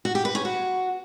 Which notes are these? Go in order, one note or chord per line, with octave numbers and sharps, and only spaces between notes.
F#4
G4
B4
C#4
F#4